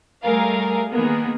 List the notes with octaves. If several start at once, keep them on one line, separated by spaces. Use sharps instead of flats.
G3 A3 G#4 A#4 F5
D#3 A#3 B3 G#4 A#4